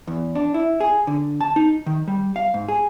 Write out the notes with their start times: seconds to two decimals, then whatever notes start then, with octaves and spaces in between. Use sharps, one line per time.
0.07 E2
0.35 D4
0.54 E4
0.80 G#4
1.07 D3
1.41 A5
1.56 D#4
1.86 D#3
2.08 G3
2.36 F5
2.54 G#2
2.68 G#4